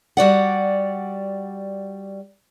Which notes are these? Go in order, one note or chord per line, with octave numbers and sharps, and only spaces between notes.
G3 F#4 D5 F#5